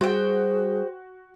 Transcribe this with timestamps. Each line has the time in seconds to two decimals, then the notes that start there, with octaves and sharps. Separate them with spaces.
0.01 G3 F#4 G#4 C5 G5